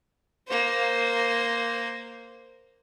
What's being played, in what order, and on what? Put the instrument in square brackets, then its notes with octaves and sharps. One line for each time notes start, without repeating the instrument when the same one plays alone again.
[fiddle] A#3 C5